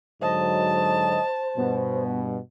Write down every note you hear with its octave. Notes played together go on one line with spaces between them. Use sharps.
G#2 D3 F#3 C5 D#5 A5
G2 B2 B3